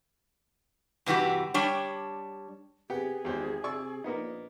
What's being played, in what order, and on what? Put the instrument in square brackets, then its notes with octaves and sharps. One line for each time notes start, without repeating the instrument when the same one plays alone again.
[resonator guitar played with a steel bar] G2 C3 E3 F#4 G4
G3 D4 C#5
[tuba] C3 [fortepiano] B3 G4 F#5 [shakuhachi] G#4
[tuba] G#1 [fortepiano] E2 G4 C5
[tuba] C3 [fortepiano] D5 C#6 E6
[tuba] A#1 [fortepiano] A#3 B3 D#4